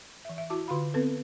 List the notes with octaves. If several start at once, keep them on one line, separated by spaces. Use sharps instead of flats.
E3 E5
E5
E4 F#4 A5 D6
D3 F4 F#4 F5 B5
B3 C4 A4 B4